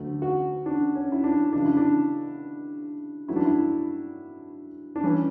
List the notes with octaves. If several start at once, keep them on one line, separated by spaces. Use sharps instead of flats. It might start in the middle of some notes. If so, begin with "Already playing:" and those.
Already playing: D2 D3 F#3 A3
F#4
D4
C#4
E4
D4
C#2 C#3 F#3 D4
E4
D4
G2 F#3 A3 E4
D4
E4
D4
E3 G3 C#4